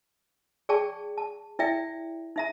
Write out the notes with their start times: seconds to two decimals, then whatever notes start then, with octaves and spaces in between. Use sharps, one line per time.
0.69 G#4 D5 G5 A5 C#6
1.18 A5
1.59 E4 D5 E5 G5
2.36 D#4 E5 A#5